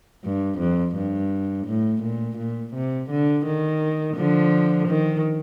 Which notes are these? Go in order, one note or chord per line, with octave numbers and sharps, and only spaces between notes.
G2
F2
G2
A2
A#2
A#2
C3
D3
D#3
D3 F3
D#3